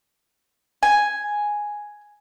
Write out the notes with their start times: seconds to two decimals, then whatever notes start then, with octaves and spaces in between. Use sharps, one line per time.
0.83 G#5